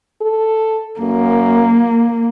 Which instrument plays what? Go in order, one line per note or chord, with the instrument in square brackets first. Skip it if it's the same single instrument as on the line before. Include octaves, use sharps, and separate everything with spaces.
[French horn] A4
[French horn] F#2 [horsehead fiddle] A#3